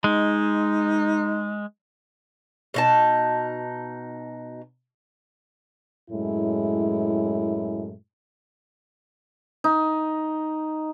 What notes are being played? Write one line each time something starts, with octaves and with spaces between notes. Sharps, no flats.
G#3 D#4
B2 D#4 A5
F#2 A2 G#3 E4
D#4